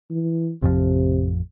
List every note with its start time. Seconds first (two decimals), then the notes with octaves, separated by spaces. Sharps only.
0.10 E3
0.62 A1 F2 C3 F3